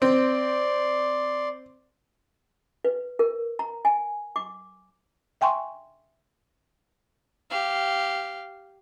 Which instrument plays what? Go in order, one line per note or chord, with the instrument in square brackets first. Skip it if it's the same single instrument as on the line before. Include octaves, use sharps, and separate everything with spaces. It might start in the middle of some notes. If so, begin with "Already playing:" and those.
[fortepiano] C4 [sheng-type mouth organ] D5 C6
[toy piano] B4
A#4
A#5
G#5
D6
[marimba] E5 G5 G#5 C6 C#6
[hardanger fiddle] G4 F5